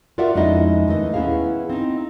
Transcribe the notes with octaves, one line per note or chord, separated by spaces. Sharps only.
F4 F#4 A#4 D5 E5 F#5
F2 G#3 C#4 D#4 E4 D#5
D#2 A3 B4 D#5
B3 C#4 E4 G#4 F5
C4 D#4